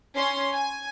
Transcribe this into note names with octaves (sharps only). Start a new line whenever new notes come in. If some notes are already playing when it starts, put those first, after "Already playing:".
C#4 C6
G#5